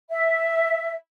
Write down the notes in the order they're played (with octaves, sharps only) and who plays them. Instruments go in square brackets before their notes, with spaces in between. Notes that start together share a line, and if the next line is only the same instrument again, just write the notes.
[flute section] E5